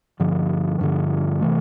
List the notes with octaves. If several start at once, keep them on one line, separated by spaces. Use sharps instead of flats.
G2 D3 F3
G2 D3 F3
C3 E3 A3